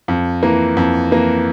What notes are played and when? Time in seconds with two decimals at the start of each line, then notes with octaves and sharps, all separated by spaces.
0.08 F2
0.43 E3 A#3
0.77 F2
1.11 E3 A#3